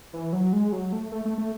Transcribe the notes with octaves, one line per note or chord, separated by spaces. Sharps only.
E3
F#3
G#3
F#3
A3
A3
A3
A3